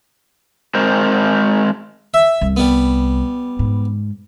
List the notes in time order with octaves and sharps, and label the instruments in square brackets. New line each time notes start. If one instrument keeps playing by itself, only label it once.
[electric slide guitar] G#3 C4 A#4 C5
[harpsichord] E5
[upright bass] C2
[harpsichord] G3 B3
[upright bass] G#2